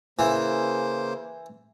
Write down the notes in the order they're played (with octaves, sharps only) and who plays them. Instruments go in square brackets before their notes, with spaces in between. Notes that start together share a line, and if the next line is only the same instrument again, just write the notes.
[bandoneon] C#3 A#3 C5 [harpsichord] E3